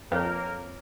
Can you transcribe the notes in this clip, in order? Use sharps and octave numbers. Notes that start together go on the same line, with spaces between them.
F2 A#3 A#4 B4 C#5